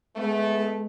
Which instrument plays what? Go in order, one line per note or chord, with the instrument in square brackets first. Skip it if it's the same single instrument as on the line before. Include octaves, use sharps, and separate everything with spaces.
[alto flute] G#3 [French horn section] A3 B3